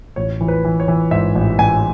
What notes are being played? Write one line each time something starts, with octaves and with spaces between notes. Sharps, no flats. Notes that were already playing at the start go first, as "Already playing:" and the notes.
A1 C#5
E3
B4
E3
C#5
E3
G#2 E5
A1
A1 G#5